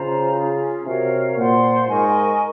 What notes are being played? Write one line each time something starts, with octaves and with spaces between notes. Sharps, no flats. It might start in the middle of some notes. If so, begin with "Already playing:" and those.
Already playing: C#3 F4 C5 D#5 A#5
C#4 F4 G#4
C3 F#4 A#4 C#5 F5
A#2 F4 C5 F#5 C6
G#2 A#4 D#5 G#5 C#6